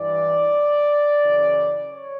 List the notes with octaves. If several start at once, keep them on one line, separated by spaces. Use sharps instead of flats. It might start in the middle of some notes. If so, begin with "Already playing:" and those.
Already playing: G2 E3 D5
F#2 C#3 E3
C#5